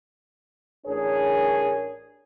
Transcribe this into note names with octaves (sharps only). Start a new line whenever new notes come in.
A1 D4 G#4 A#4 C#5